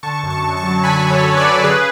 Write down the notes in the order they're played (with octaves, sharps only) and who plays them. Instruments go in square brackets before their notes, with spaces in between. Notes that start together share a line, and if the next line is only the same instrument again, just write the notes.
[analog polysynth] D3 A5 C#6
F#2
A5 C#6
F#2
A5 C#6
F#3
D3 G#5 B5
F#2
A4 C#5
F#2
B4 D5
F#3
C#3 G#4 B4